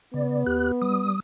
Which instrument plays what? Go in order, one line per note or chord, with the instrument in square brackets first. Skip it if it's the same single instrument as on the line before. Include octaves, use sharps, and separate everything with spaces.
[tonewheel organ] C#3 D5 [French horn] B3
[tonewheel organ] D#2 G4 F#6
G3 D#6